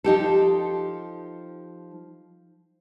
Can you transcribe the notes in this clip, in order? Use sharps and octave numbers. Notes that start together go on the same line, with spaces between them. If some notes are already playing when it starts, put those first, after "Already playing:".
F3 D#4 G4 A4